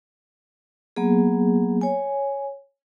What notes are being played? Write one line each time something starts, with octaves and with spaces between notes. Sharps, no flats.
F#3 A#3 B3 G#4
C#5 G#5